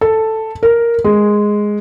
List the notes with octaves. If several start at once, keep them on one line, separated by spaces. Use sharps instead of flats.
A4
A#4
G#3